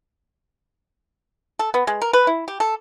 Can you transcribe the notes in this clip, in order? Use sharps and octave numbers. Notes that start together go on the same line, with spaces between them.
A4
B3
G#3
A#4
B4
E4
G4
A4